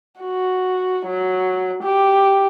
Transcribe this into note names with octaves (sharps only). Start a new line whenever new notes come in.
F#4
F#3
G4